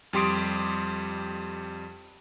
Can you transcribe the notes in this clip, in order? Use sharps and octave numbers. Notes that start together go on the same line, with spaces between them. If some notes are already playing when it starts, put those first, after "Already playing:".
F2 G3 G4 C6 D#6 D7